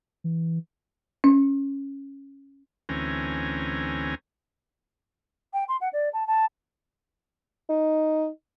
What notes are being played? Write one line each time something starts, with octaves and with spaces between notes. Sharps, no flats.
E3
C#4
D2 E3 C4 C#4 G#5 A#5
G5
C6
F#5
D5
A5
A5
D#4